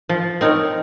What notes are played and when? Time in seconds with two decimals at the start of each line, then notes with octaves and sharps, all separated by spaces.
0.09 F3
0.41 C4 D#4 A#4 C#5